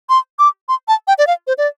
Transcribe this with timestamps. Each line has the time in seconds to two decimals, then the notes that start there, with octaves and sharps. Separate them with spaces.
0.09 C6
0.39 D6
0.69 C6
0.88 A5
1.07 G5
1.18 D5
1.27 F5
1.47 C5
1.58 D5